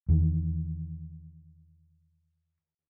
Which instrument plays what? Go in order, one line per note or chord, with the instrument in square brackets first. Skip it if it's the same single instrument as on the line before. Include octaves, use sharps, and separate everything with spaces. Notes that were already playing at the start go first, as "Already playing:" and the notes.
[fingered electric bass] E2 D#3